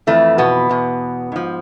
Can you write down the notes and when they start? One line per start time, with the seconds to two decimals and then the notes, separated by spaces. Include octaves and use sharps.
0.07 F2 E3 A3
0.38 B2 B3
0.69 E2 B2
1.32 G#2 F3